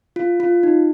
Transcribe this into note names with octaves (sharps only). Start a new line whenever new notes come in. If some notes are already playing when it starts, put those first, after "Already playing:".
F4
F4
D#4